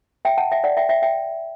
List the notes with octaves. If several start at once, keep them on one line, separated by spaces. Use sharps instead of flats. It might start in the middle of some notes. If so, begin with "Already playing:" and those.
E5 G5
F#5 A5
E5 G5
D5 F#5
E5 G5
E5 G5
E5 G5